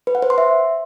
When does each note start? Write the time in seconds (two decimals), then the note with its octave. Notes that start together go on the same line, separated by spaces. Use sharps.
0.07 B4
0.15 F#5
0.22 C5
0.30 C6
0.38 E5